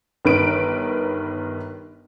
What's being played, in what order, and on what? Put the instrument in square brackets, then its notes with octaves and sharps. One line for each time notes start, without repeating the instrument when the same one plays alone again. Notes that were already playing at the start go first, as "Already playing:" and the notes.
[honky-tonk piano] G1 D#3 B4 D7